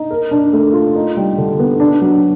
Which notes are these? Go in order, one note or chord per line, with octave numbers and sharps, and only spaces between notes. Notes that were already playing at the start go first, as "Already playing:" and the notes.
Already playing: D#4
A#4
D4
A3
F4
D#4
G3
D3
B3
D4
F#3